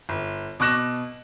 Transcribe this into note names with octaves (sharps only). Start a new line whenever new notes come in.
G1
B2 C#6 D6 F#6 A#6 E7